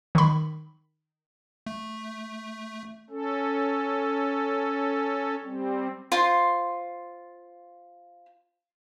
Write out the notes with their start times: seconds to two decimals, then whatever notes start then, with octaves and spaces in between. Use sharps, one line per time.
0.15 D#3 B5
1.66 A3
3.10 C#4 A4
5.44 G3 C4
6.12 F4 C5 C6